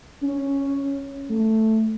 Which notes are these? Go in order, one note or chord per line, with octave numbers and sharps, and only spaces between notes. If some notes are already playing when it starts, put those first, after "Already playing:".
C#4
A3